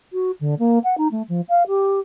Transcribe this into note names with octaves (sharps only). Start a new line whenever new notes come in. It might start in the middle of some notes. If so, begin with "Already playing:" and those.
F#4
D3
A#3
F#5
D#4
A3
F3
F5
G4